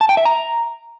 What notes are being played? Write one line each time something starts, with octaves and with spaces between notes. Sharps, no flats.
A5
G5
E5
A#5